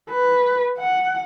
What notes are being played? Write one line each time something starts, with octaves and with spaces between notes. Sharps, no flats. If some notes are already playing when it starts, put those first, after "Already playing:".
B4
F#5